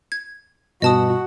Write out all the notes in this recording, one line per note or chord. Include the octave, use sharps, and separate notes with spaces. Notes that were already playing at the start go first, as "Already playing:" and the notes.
G#6
G2 B2 F#4 D#5 A5 D#6